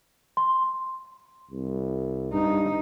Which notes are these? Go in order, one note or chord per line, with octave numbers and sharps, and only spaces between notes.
C6
C2
G2 D#4